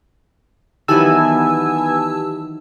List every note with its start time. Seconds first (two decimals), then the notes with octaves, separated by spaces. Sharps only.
0.88 D#3 E3 F#3 B3 G4 G#5 A5 E6